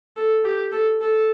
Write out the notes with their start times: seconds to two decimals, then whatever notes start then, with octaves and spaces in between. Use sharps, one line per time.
0.17 A4
0.44 G4
0.72 A4
1.01 A4